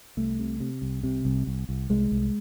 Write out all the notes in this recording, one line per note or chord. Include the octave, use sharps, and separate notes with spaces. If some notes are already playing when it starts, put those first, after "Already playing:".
C2 A3
C3
C3
C2
C3
C2
C2
C2
C2 G#3
C2